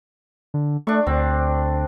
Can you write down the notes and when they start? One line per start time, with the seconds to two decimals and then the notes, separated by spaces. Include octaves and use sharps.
0.54 D3
0.87 A3 D4 C#6
1.07 D2 C4